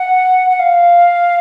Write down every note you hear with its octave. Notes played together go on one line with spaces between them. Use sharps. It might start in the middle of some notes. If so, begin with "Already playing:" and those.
Already playing: F#5
F#5
F5